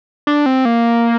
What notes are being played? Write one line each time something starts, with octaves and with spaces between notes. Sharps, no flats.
D4
C4
A#3